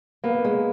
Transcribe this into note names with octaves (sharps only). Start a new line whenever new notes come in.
A#3 B3
G#3